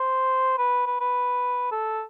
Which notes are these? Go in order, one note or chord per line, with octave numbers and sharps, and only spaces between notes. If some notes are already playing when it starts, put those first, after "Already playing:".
Already playing: C5
B4
B4
B4
A4